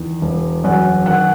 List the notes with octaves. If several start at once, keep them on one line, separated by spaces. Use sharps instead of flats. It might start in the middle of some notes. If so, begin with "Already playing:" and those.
Already playing: E2 D#3
E1
F#2 F#5
D#3 F#5